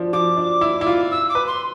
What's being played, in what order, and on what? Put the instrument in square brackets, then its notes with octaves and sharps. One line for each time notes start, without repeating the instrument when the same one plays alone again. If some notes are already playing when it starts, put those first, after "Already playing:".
Already playing: [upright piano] F3 D4
[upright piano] F3 [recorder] D6
[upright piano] D4
E4
E4
F4
[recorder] E6
D6
[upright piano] B4
[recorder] C6